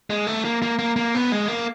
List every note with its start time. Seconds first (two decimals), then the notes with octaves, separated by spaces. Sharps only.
0.10 G#3
0.27 A3
0.45 A#3
0.62 A#3
0.79 A#3
0.96 A#3
1.15 B3
1.32 G#3
1.48 A#3